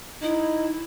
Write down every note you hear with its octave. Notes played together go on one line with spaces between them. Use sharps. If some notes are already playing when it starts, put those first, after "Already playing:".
D#4 E4